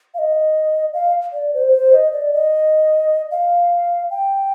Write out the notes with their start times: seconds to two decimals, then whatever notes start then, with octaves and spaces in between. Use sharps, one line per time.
0.14 F5
0.19 D#5
0.94 F5
1.33 D5
1.54 C5
1.73 C5
1.93 D#5
2.13 D5
2.32 D#5
3.31 F5
4.10 G5